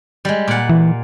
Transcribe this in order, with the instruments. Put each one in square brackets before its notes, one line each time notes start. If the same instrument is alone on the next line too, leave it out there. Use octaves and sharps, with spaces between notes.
[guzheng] G3 G#3
A#2 F#5
[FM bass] E3